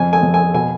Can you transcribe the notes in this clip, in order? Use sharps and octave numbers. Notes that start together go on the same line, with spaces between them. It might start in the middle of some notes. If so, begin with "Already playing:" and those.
Already playing: F2 G#5
G#5
F2
G#5
B2 G#5